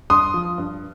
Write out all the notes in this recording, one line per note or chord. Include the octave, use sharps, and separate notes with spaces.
G2 C6 D#6
F3
G2